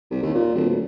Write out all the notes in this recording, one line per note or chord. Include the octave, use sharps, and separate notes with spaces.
C2
D#2
A#2
D1
D1